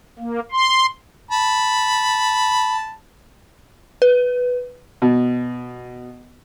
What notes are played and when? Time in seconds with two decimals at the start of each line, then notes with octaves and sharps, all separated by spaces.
0.19 A#3
0.52 C6
1.31 A5 B5
4.02 B4
5.02 B2